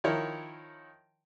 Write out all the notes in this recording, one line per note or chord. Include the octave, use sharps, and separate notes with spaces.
D#3 F3 E4 A#4 C#5